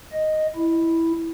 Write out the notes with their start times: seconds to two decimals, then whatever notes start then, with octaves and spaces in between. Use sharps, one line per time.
0.12 D#5
0.56 E4